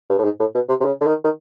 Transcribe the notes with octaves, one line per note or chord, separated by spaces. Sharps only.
G2
A2
G#2
A2
B2
C3
C3
C#3
D3
D#3
D#3